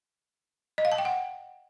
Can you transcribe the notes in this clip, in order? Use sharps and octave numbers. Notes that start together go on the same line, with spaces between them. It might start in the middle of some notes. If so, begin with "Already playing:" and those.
D#5
F5
A5
G5
F#5